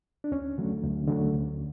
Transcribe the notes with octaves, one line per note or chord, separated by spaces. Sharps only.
D4
D2 C#4
D3 F#3 A3
D2
D3 F#3 A3
D2